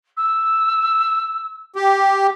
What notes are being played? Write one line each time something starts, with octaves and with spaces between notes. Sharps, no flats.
E6
G4